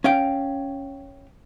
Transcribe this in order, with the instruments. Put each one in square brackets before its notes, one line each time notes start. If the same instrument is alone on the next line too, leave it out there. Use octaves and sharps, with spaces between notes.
[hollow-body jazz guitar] C#4 F5 G5